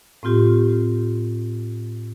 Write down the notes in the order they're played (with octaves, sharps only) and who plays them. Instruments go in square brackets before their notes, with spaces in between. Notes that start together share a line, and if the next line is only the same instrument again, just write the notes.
[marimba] A2 C4 F4 G4